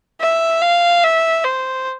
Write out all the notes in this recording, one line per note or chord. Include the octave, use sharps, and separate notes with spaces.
E5
F5
E5
C5